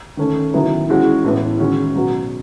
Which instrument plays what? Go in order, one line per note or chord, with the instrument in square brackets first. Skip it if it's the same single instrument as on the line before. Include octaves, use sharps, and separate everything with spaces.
[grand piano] D#3 A3 C#4
D#3 F#3 B3 E4
E3 G#3 C#4 F#4
A2 E3 B3
D#3 G#3 C#4 F#4
B2 F#3 B3 F#4